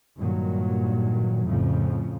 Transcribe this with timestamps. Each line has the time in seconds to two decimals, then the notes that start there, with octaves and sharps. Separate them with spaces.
0.17 G2 A#2 D#3 F#3
1.46 F2 A2 C#3 F3